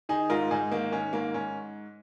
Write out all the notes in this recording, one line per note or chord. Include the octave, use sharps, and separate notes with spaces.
D#3 D#4 G#4
G#2 F4 A#4
G#2 D#4 G#4
D#3 A#3
D#3 C#4
G#2 A#3
G#2 C#4